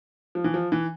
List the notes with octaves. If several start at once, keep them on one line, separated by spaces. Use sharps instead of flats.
F3
E3
F3
E3